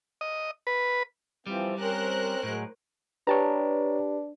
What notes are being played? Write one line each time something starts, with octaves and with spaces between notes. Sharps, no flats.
D#5
B4
E3 F3 G3 C4
C4 C#4 A#4 C5 F#6
A2 F#3 G#3
D4 G4 B4 C#5 A5 A#5